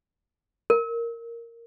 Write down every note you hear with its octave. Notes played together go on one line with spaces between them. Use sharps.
A#4